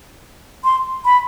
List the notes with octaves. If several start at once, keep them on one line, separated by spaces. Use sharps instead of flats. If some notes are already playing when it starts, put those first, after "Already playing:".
C6
B5